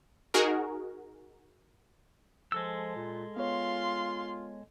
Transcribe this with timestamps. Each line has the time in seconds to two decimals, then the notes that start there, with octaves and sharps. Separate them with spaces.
0.34 D#4 F#4 G#4 A#4
2.52 F3 G#3 A4 E6
2.96 A#2
3.37 B3 F4 C#5 F5 C6